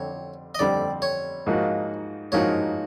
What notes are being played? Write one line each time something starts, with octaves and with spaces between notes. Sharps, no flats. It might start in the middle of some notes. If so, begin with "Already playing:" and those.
Already playing: F2 D3 G3 C4 C#5
D#5
F2 D3 G3 C4 D5
C#5
G#2 F3 A#3 D#4 F#4
G#2 F3 A#3 D#4 F#4 C#5